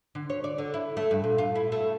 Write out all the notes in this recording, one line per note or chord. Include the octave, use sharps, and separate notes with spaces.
D3
C#5
D5
D3
E4
A3
G2
A#2
F4
E4
A3